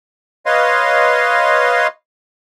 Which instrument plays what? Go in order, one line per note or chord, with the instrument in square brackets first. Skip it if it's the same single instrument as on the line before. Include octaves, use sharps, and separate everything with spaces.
[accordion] B4 C#5 D#5 F5 C6